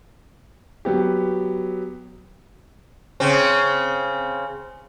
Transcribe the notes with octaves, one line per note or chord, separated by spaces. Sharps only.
F#3 B3 G4
C#3 C4